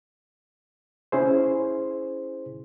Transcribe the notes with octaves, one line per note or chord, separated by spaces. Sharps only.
C#4 E4 G#4 C5